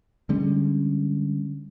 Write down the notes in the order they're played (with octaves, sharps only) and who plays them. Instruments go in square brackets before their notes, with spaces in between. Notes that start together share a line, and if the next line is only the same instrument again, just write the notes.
[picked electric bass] D3 G3 G#3 C#4